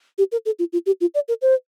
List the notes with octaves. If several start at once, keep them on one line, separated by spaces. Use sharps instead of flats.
G4
A#4
A4
F4
F4
G4
F4
D5
A#4
C5